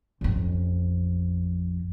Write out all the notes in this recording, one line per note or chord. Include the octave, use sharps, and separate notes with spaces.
A1 F2